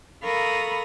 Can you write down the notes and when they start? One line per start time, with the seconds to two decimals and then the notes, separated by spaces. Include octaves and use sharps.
0.23 A4 A#4 F5 B5 C#6 D#6